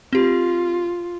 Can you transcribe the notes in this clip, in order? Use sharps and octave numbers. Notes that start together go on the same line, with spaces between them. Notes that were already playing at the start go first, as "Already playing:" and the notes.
C4 F4 G4